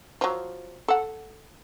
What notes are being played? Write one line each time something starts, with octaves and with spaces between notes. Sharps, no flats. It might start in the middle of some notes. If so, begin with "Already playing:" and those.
F3 F#3
A4 F#5